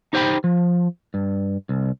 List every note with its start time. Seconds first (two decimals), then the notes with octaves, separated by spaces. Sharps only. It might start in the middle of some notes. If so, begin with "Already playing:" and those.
0.13 D#4 G4 C5 D5 G5 B5
0.44 F3
1.14 G2
1.69 C2